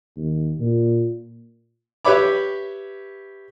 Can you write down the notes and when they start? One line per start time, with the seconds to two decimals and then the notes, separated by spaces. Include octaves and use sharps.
0.16 D#2
0.59 A#2
2.05 G4 B4 C#5 E5 B5 D6